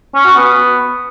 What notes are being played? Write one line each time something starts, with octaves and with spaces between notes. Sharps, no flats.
C#4
F#4
B3